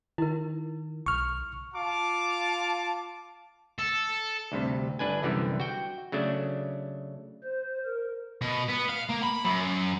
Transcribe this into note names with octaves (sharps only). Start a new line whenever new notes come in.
D#3 E4 A#4
B1 C#6 F6
F4 F5 A5 D6
A4
D2 G2 C3
G1 D4 B4 G#5
C2 F#2 D3 E3 G3 B3
F#4 G5
C#3 F#3 A3 D4
C5
A#4
B2
B3
F5
A#3
B5
F#2